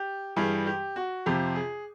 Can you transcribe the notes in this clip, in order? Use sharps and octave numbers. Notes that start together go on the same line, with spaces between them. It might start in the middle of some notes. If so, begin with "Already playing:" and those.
Already playing: G4
G2 E3 G3 G#4
G4
F#4
F2 C3 F3 G4
G#4